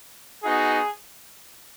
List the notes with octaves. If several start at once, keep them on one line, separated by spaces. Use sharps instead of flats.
B3 D#4 F#4 G#4